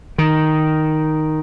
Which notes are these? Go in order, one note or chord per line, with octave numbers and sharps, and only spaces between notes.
D#3